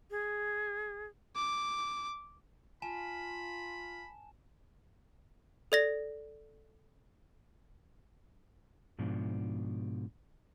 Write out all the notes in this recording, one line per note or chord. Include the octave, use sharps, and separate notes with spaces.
G#4
D6
F4 G#5 A5 B5 E7
A4 D5 A#6
G#2 B2 F3 D4